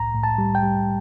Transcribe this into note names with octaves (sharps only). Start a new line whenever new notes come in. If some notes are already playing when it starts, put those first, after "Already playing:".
Already playing: C2 A2 A#5
A2
A5
G3
G5
G3